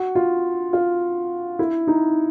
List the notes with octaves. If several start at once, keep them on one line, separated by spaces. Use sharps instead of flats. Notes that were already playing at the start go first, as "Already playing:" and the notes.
Already playing: F#4
F4
F4
E4
D#4